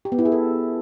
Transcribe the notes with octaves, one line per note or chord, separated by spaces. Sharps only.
G4
B3
E4
G#4
A4